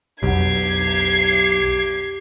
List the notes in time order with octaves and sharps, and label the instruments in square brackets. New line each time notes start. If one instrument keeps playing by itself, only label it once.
[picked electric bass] B1 [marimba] F2 F#5 [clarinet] G4 [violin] G#6 C7